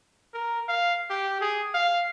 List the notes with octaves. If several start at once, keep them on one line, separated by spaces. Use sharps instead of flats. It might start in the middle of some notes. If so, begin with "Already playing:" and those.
A#4
F5
G4
G#4
F5